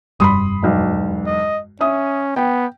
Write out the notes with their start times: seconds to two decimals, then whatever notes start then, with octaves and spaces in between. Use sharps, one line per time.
0.20 F1 G2 G3 B5 C6 D#6
0.63 E1 B1
1.26 D#5
1.81 C#4 E5 D#6
2.36 B3 G5